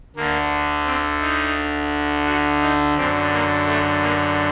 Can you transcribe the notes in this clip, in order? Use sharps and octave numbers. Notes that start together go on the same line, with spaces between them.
D2 D3 A#3
C4
D#4
F#4
D#4
F#2 D3 C4
A#3
A3
A#3